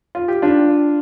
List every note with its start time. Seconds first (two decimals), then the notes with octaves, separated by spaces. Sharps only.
0.15 F4
0.28 G4
0.42 D4 F4